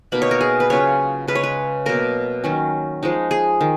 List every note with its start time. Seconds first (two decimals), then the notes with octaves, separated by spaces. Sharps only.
0.12 B2 A#3 D#4 B5
0.22 C#5
0.31 A#4
0.41 G#4
0.60 B4
0.70 C#3 F#3 C#4 F4 C#5
1.28 C#3 G#3 C#4 B4
1.35 C#5
1.43 B4
1.86 B2 F#3 A#3 A#4
2.44 D#3 F#3 C#4
3.03 F3 G#3 D#4
3.31 G#4
3.61 D#3